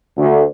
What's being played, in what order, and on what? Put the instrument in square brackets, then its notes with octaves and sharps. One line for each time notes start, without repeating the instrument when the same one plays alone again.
[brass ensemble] D2